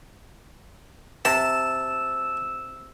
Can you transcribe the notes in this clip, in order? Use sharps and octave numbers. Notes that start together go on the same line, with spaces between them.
C3 A5 E6